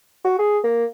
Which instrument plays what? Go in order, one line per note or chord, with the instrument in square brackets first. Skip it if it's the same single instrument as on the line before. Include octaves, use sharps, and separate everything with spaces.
[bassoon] F#4
G#4
A#3